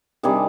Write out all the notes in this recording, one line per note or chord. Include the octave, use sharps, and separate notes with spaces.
C3 D#3 G3 D4 G#4 G#5